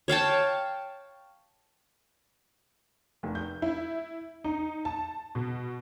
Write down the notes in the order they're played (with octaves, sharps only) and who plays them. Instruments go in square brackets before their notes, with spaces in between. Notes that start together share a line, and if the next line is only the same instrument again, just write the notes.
[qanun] C#5 F5 G5 A5
[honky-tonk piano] F1
G6
E4
D#4
A5
B2